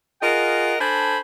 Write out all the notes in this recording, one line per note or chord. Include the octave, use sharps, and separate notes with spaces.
F4 G#4 A#4 D#5 F#5
D4 A4 C5 G#5 B5